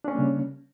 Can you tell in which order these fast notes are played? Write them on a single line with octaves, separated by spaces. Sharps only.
D4 C#4 A#3 G3 C#3